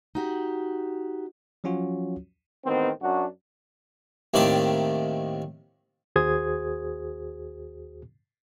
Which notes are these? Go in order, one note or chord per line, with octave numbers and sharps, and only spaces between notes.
D#4 F#4 G4
F3 F#3 C#4 F4 F#4 C#5
A1 D#3 B3 C4
F#2 D4 F#4
D#2 A2 D#3 C4 A5 D6
D#2 F#4 G#4 C5 D#6 G#6